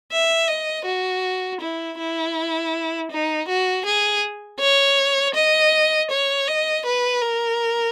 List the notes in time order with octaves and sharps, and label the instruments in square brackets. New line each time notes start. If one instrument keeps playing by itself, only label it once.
[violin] E5
D#5
F#4
E4
E4
D#4
F#4
G#4
C#5
D#5
C#5
D#5
B4
A#4